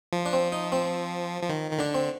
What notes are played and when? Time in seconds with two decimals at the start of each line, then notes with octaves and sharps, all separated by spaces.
0.13 F3
0.26 D4
0.33 C4
0.52 D#4
0.72 C4
1.42 F3
1.49 D#3
1.71 D#3
1.78 D3 D4
1.94 C4